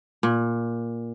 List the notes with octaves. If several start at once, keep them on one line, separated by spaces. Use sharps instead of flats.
A#2